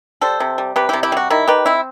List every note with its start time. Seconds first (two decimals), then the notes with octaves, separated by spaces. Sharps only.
0.21 G3 A4 C5
0.40 C3
0.58 G3
0.76 C3 G4 B4
0.89 C3 E4 G4
1.03 E4 G4
1.12 G3 F#4
1.30 D#3 E4
1.48 D#3 G4 B4
1.66 C4 E4